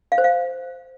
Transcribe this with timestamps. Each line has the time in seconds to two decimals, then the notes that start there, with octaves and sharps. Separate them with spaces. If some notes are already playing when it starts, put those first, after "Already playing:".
0.12 F5
0.18 C5
0.24 F5